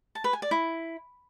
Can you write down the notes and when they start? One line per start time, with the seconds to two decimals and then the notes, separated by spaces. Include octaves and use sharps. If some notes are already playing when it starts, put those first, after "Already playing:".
0.15 A5
0.24 B4
0.33 G#5
0.42 D5
0.51 E4